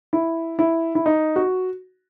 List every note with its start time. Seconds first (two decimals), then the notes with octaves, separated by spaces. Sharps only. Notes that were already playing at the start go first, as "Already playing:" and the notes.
0.13 E4
0.59 E4
0.95 E4
1.06 D#4
1.36 F#4